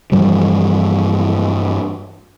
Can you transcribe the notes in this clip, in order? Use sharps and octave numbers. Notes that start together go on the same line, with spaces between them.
G2 E3 F3 G3